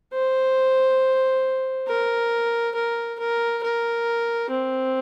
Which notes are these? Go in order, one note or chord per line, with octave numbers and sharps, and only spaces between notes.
C5
A#4
A#4
A#4
A#4
C4